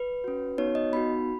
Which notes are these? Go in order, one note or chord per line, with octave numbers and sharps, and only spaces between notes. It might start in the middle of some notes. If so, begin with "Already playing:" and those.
Already playing: B4
C#4 F#4
B3 D#4 F#4 C#5
D#5
B3 D#4 F#4 B5